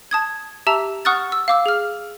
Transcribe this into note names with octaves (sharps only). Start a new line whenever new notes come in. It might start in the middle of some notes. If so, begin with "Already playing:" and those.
A5 D#6 G#6
G4 E5 A5 A#5 E6
F#5 C#6 D#6 F6 F#6 A6
E6
F5 D6 E6
G#4 F6